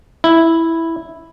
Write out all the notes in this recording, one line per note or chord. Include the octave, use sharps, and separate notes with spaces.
E4